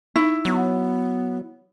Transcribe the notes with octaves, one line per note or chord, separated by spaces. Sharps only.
D#4 E4
F#3 B3